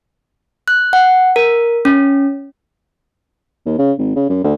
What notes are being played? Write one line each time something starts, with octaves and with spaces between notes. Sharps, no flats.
F#6
F#5
A#4
C#4
D#2
C#3
G#1
C#3
F#2
D2